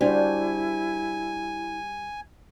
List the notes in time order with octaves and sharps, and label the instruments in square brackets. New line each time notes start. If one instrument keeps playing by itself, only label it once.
[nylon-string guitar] G3 [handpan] D4 F#4 C5 [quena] E4 [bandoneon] G#5